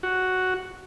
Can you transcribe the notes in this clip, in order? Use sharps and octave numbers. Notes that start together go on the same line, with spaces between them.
F#4